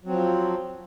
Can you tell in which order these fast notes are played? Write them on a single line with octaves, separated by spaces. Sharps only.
F#3 C4 F3